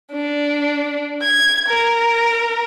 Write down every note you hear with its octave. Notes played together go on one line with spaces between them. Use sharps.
D4
G#6
A#4